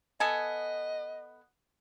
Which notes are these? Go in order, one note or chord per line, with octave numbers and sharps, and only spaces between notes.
B3 A4 D#5 G#5